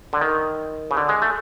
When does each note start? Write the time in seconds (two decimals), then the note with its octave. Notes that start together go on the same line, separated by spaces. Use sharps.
0.13 D3
0.21 D#3
0.91 C#3
0.97 D3
1.09 G#3
1.22 A3